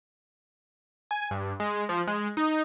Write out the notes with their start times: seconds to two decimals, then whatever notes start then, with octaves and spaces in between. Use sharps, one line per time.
1.11 G#5
1.31 G2
1.60 G#3
1.89 F3
2.07 G#3
2.37 D#4